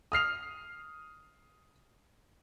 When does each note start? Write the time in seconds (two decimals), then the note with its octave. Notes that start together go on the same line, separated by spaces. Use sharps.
0.12 D#6 F6 C7 F7